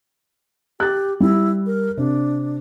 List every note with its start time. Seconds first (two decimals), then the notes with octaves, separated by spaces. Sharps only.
0.80 G4 F#6 A6
1.20 G3 E4
1.66 A#4
1.97 C3 D4